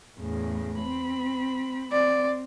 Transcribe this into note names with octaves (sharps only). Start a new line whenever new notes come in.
E2 A2 C#3
C4 B5
C4 D5